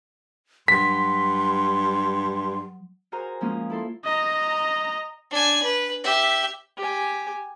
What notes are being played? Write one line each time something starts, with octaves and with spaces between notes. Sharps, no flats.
G2 F#3 C6 B6
F#4 G#4 A#4 C5 G#5 A#5
F3 G#3 A#3 C#4 D#6 F6
E4 A4 C6
D#5 A#5
D4 G#5
B4
G4 E5
G4 G#5